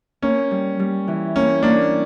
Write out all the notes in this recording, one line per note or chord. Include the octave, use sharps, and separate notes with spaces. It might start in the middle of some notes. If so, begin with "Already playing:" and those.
A#3 C#4
G3
G3
E3
A#3 C#4
A#3 D4